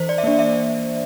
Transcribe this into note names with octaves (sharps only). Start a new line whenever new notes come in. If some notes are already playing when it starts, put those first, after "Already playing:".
Already playing: E3 C5
D5
E5
A#3 D4 D5
E5